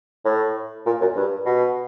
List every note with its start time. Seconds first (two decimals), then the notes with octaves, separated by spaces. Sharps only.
0.25 A2
0.86 A#2
1.01 F#2
1.16 G2
1.46 B2